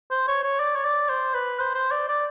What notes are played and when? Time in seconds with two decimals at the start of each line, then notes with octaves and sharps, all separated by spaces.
0.11 C5
0.28 C#5
0.43 C#5
0.60 D5
0.75 C#5
0.85 D5
1.09 C5
1.33 B4
1.59 C5
1.74 C5
1.91 D5
2.08 D5